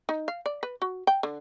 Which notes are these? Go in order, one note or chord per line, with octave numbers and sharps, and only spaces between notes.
D#4
F5
D5
B4
F#4
G5
D3